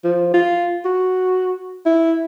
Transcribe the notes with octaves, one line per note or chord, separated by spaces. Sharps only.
F3
F4
F#4
E4